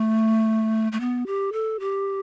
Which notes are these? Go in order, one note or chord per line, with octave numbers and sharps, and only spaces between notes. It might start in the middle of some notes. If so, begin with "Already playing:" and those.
Already playing: A3
A3
B3
G4
A4
G4